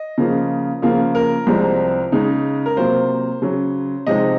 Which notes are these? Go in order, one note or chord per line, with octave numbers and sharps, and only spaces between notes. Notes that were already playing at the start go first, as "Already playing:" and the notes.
Already playing: D#5
C#3 F3 A#3 F4
C#3 F3 A#3 F4
A#4
C2 C3 F3 G#3 C4
C#3 G#3 D#4
A#4
C3 F#3 A#3 F4 C5
C#3 F#3 C#4
C3 F3 G#3 C4 D#4 D#5